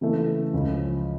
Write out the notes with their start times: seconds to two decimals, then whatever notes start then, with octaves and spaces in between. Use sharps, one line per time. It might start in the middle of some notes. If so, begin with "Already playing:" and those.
0.01 C#3 E3 A3
0.53 C#2 C#3 F3 C#4